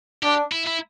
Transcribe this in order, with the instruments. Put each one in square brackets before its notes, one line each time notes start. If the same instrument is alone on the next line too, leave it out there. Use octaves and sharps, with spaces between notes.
[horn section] D4 [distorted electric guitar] G4
[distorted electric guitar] E4
E4